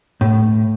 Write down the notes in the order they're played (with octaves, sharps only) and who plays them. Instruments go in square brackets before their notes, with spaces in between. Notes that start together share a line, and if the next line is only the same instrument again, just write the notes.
[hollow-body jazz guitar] A2